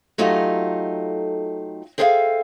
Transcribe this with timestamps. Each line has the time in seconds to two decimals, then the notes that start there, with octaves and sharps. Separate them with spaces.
0.18 F#3 A3 D#4 F4 G4 A4
1.98 C4 G#4 A4 C5 E5 F5